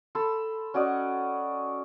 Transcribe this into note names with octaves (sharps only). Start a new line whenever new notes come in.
A4 A5 B5 C6
C#4 F#4 D5 D#5